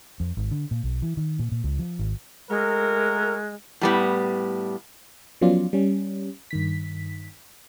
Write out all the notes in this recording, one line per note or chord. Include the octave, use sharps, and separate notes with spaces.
F2
G#1
D3
A#2
B1
E3
D#3
A#2
A#2
C#2
F3
G#1
G#3 A3 F#4 A#4
A2 G3 B3
F3 F#3 B3 C#4 F4 D5
G3 C#4
G2 D#3 B6